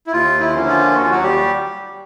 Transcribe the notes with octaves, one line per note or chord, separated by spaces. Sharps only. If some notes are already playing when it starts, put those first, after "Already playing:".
E4
D#2 F4
E4
D3 F3 A#3 C#4
F4
D#2 F#4
F4
F#3 F#4
G3 G4